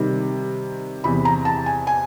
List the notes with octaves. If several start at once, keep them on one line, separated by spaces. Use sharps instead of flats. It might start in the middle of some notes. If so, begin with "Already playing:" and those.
Already playing: C3 D#3 G3
E2 C3 E3 B5
A#5
A5
G#5
G#5